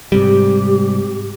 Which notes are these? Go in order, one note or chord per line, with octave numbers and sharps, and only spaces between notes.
G#2 C3 G3 G4